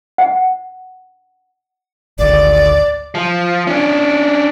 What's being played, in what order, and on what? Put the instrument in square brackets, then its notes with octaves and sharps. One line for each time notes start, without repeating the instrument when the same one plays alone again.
[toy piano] F#5
[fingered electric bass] G#1 D2 [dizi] D5
[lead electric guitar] F3
C#4 D4